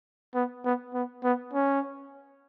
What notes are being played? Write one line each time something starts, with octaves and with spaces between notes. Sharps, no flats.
B3
B3
B3
B3
C#4